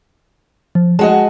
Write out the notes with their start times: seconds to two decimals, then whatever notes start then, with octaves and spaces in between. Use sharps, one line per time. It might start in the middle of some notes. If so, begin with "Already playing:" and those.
0.75 F3
0.99 G#3 F#4 D#5 A5